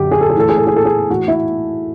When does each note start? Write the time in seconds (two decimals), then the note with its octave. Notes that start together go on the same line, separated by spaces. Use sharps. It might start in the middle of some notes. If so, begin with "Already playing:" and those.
Already playing: F#2 D3 G4
0.11 G#4
0.21 A4
0.30 G#4
0.36 A2 E3 A4
0.49 G#4
0.57 A4
0.67 G#4
0.76 A4
0.85 G#4
1.09 A2 E3 F#4
1.28 E4